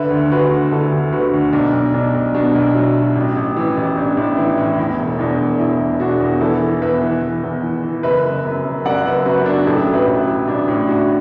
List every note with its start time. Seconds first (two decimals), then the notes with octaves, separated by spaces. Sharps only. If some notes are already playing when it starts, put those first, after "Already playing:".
Already playing: D3 B4 E5
0.10 D2
0.31 D2 F#4 B4
0.51 D3
0.72 D2 E4 A4
0.92 D2
1.13 D3 F#4 B4
1.33 D2
1.53 B1 D4
1.73 B1
1.94 B1 D4
2.14 B1
2.34 B2 D4
2.55 B1
2.75 F#3 E4
2.96 F#3
3.16 A1
3.36 A1
3.56 E3
3.77 A1
3.97 A1 D4
4.17 A1 E4
4.38 E3 E4
4.58 A2
4.78 E2 E4
4.99 E1
5.19 E2 D4
5.40 E1
5.60 E2 E4
5.80 E1
6.00 E1 D4 F#4
6.21 E2
6.41 E3 E4 A4
6.61 E3
6.82 E2 B4 E5
7.02 E3
7.22 E3
7.43 E2
7.63 E3
7.84 E3
8.03 F#1 B4 E5
8.24 F#1
8.45 F#2
8.65 F#2
8.85 F#2 D5 F#5
9.05 F#1 B4 E5
9.25 F#2 F#4 B4
9.45 F#1 D4 F#4
9.66 A1 E4 A4
9.86 F#3
9.94 B4 E5
10.07 A1
10.21 E4
10.27 F#3
10.48 A1 D4
10.68 A2 E4
10.88 A2 D4 F#4